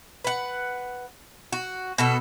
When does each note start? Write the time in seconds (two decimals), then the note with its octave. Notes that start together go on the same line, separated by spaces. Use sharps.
0.24 B4 F#5
1.52 F#4
1.98 B2 F#4 A4